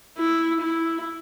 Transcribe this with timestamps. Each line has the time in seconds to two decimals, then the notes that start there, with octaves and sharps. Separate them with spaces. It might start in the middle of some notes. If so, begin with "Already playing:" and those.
0.18 E4
0.61 E4